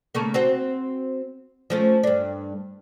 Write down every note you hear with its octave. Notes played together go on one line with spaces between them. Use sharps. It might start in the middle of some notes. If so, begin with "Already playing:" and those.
C#3 A3 A#3
C4 F#4 C5
F3 A3 C#4
G2 D4